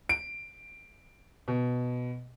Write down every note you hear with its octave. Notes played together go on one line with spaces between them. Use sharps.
D7
B2